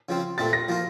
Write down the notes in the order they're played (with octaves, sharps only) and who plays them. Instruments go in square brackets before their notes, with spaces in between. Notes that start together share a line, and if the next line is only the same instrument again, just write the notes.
[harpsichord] C#3 F3 C4
[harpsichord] A#2 A3 C4 [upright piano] A6
[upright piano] A#6
[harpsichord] F3 A#3 F4